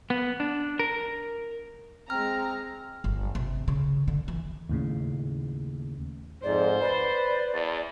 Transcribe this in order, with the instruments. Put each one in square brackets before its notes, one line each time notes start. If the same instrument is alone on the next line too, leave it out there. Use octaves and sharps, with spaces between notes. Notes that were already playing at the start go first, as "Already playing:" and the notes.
[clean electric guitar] B3
D4
A#4
[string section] G#3 A#5 [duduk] C4 [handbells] F6
[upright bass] G1
C3
C#3
D3
E3
[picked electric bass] D#2 A2 C#3
[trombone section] F2 G#2 [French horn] C5 [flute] D5
[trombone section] B4 [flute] D5
[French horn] E2